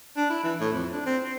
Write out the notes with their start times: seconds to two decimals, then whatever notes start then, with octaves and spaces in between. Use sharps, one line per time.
0.17 D4
0.29 E4
0.44 E3
0.60 A2
0.72 F2
0.92 D4
1.06 C4
1.24 C4